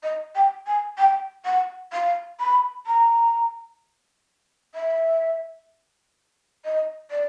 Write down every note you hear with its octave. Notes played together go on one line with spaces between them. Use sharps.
D#5
G5
G#5
G5
F#5
F5
B5
A#5
E5
D#5
D5